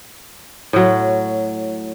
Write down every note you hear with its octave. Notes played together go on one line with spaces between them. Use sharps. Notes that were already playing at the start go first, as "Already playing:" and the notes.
A2 F#3